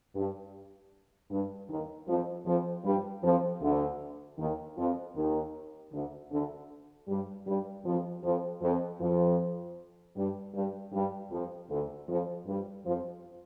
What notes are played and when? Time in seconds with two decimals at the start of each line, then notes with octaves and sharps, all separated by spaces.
0.16 G2
1.31 G2
1.69 D#2 D#3
2.08 F2 F3
2.46 F2 F3
2.85 G2 G3
3.24 F2 F3
3.61 D2 D3
4.39 D#2 D#3
4.78 F2 F3
5.16 D#2 D#3
5.92 D2 D3
6.31 D2 D3
7.08 G2 G3
7.47 G2 G3
7.85 F2 F3
8.23 F2 F3
8.62 F2 F3
9.01 F2 F3
10.16 G2 G3
10.54 G2 G3
10.93 G2 G3
11.31 F2 F3
11.70 D2 D3
12.09 F2 F3
12.47 G2 G3
12.86 F2 F3